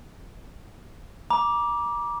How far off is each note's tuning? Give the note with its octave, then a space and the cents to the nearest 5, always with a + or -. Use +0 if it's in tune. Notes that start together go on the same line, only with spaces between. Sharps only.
A#5 +35 D6 +0